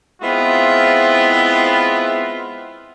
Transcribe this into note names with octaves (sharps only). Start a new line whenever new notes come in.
G#3 B3 C4 E4 F4